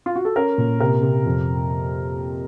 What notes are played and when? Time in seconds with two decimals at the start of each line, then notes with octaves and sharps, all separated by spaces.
0.06 F4
0.16 F#4
0.25 A4
0.36 C#4 A#4
0.58 A#2
0.80 C3 A#4
1.03 C3
1.26 F2